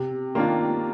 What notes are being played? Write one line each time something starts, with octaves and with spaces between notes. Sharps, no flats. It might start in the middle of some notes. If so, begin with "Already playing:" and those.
Already playing: C3
D#3 A#3 D4 F4